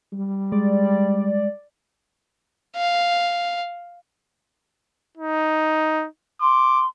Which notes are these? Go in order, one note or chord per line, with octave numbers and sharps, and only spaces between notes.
G3
G#3 D5
F5
D#4
C6 D6